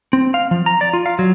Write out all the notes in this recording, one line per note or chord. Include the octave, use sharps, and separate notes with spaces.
C4
F5
F3
A#5
D5
F4
F5
F#3